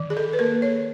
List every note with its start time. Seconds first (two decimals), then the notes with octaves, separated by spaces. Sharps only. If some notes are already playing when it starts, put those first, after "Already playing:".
Already playing: D#3
0.10 G#4
0.17 A4
0.33 B4
0.39 A#3 A#4
0.62 C#5